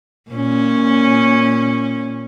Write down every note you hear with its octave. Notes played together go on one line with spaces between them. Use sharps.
A#2 C#4